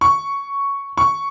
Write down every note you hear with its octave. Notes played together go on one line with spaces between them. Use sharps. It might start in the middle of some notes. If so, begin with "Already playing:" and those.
C#6
C#6